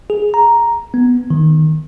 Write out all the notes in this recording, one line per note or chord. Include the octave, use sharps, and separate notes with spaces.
G#4
A#5
B3
D#3